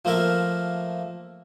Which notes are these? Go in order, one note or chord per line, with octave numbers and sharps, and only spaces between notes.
F3 A3 A#3 A#4 E5 F5